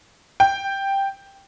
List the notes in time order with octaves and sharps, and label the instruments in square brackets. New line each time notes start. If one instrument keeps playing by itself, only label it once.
[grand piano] G5